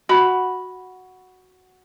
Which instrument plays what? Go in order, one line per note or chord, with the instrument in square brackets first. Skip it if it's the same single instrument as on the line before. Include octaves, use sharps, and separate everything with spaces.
[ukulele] F#4 B5